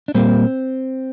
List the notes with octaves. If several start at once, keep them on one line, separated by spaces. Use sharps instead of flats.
D4
A#2 G3 A#3 C4